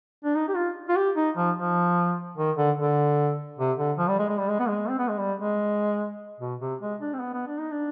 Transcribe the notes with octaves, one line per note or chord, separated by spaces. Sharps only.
D4
D#4
G4
F4
F4
G4
D#4
F3
F3
D#3
D3
D3
C3
D3
F3
G3
G#3
G#3
G3
G#3
B3
G#3
C4
B3
G#3
G3
G#3
B2
C3
G#3
D4
C4
B3
B3
D4
D#4
D4